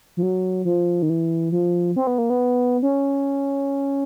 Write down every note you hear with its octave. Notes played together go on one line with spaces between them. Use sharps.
F3
F#3
F3
D#3
E3
F3
C4
B3
A#3
B3
C#4